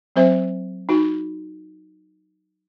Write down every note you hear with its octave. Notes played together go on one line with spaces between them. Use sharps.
F#3 C4 C5 E5
D#4 F#4